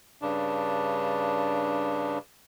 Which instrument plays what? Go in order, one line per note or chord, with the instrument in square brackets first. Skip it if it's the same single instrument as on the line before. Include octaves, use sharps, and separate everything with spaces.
[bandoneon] G2 C#3 D4